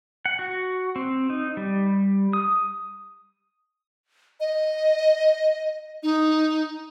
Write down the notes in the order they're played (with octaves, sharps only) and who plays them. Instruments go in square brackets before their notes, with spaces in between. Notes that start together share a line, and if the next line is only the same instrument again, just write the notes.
[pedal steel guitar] F#5
F#4
C4
D#4
G3
D#6
[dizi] D#5
D#4